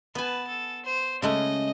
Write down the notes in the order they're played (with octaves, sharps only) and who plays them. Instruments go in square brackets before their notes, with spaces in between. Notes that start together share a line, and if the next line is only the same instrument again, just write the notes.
[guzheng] B3 G#5 [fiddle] B4 A5
[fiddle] A4
C5
[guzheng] C#3 G#3 A3 [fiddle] D#5